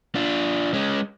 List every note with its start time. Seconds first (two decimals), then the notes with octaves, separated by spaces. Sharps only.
0.15 D4 F4
0.74 G#3 C#4